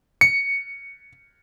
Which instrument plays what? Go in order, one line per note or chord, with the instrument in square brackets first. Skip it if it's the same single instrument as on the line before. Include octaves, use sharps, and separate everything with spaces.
[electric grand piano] C#7